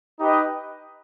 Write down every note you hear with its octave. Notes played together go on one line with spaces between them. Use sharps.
D#4 G4 B4 D#5